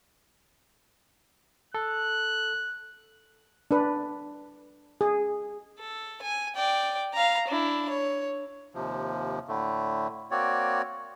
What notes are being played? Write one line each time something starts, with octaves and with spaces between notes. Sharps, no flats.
A4 F#6
D4 B4
G#4
A4
G#5
D5 G5
F5 A#5
D4 E4
C#5
D#2 C3 F3
A2 D3 A3
A#3 C4 F#4 C#5 D5